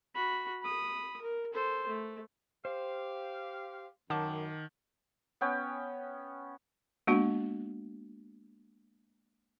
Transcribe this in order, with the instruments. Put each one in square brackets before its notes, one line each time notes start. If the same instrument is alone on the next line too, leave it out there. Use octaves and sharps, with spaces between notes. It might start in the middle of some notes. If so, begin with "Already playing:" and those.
[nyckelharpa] F#4 B5
B5 D#6
A#4
A4 C5
A3
[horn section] G4 F5 [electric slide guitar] C5
[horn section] F#2 [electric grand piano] D#3 [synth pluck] F#5 A5 D6
[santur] B3 C#4 G5
[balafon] G#3 A#3 B3 D4 F#4